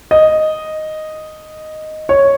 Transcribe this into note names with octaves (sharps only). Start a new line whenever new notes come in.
D#5
C#5